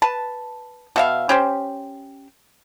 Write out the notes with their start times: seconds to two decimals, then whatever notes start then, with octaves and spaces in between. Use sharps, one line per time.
0.02 B4 A5
0.96 B2 E5 F5
1.29 C#4 G4 C5